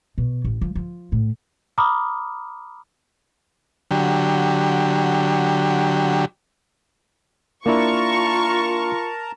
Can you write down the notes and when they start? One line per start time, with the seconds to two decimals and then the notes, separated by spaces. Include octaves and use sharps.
0.18 B2
0.44 A1
0.61 F3
0.75 F3
1.12 A2
1.78 A#5 B5 D6 D#6 F6
3.91 D3 F#3 G4
7.66 A#3 D4 E4 F4 A#4 A5 A#5 C#6